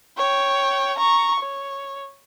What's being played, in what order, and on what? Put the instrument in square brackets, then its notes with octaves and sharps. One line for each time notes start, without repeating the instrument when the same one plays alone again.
[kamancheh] C#5 G5
A#5 C#6
C#5